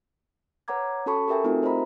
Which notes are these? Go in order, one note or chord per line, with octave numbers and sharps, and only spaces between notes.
B4 C#5 F#5 A#5 D6 G#6
C#4 F#4 A4 A5 B5 C#6
G4 A4 A#4 E5 G5 G#5
A3 C4 D#4 F4 F#4 A#4
G4 C5 D#5 E5 A#5 B5